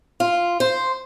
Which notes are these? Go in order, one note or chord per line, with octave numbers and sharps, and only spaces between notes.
F4
C5